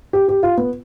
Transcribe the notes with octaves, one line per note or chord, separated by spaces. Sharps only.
G4
G4
F4
B3